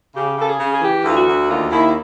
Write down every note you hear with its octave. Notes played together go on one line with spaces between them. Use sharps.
C#3 G4
C#3 A4
G#4
C#3
G#4
E3 G4
D2 F4
F#4
D2
D#2 F4
D#2 E4